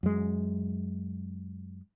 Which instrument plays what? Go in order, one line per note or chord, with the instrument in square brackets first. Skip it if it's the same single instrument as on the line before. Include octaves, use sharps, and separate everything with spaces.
[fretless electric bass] F#2 G#3